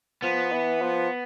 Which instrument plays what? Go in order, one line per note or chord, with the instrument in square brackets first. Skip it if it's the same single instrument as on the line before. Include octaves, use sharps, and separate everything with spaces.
[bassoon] F3 [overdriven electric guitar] B3
[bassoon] E3
F3